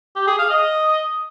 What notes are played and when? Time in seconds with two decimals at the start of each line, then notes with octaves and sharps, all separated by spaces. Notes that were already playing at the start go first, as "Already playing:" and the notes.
0.16 G4
0.27 G#4
0.38 F5
0.50 D#5